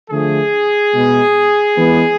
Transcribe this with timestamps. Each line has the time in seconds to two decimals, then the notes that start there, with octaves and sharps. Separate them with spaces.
0.10 D3 F3 A3 G#4
0.92 B2 G#3 B3
1.76 E3 G#3 B3